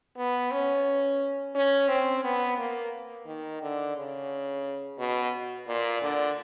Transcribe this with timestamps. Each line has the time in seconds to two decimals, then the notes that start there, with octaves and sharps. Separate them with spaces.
0.17 B3
0.51 C#4
1.55 C#4
1.88 C4
2.24 B3
2.58 A#3
3.26 D#3
3.62 D3
3.96 C#3
4.98 B2
5.67 A#2
6.02 D3